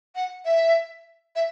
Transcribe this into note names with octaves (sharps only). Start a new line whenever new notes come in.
F#5
E5
E5